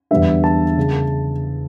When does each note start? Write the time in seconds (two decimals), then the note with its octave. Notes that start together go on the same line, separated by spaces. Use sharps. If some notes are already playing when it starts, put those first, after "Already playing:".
0.11 E2 D3 G3 B3 D4 E5
0.44 A5
0.77 C#3